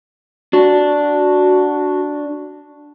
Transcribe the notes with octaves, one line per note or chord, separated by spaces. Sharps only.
D4 F#4